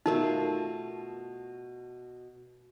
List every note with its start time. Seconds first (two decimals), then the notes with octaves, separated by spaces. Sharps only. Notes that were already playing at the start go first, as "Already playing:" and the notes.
0.06 B2 A3 D#4 F4 A#4